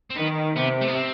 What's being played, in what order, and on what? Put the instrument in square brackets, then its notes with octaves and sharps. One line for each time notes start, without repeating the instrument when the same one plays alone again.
[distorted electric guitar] C4
[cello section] D#3 [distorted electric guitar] B3
[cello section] C3 [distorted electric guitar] B3
[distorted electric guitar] A3
B3
C4